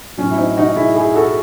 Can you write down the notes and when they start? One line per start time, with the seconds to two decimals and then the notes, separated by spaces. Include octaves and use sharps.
0.18 A2 F#3 C#4
0.31 E4
0.38 C4 D#4
0.57 D#4 F#4
0.76 E4 G#4
0.96 E4 G#4
1.15 F#4 A4